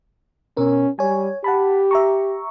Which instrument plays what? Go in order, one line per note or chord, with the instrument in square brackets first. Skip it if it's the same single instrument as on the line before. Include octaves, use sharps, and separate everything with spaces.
[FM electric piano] B2 A#4 [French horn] C#4
[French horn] G3 [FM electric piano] C#5 G#5
[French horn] G4 [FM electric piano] F#5 A5 B5
[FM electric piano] E5 A#5 C#6